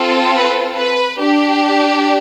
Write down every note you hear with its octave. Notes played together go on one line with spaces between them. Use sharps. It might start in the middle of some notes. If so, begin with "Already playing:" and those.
Already playing: C4 F4 A4
B4
B4
D4 G4